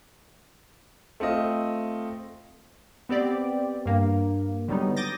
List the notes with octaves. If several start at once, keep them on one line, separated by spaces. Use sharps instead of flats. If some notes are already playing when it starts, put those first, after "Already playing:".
A3 C4 F4 D#5
B3 C4 G4 D5
G2 A#3
D3 F#3 G3 B3 D#4
D6 D#6 G6 A6 A#6